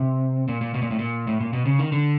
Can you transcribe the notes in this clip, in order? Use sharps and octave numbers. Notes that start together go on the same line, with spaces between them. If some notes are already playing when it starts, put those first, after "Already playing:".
Already playing: C3
A#2
A#2
B2
A#2
A2
A#2
A2
A#2
B2
C#3
D#3
D3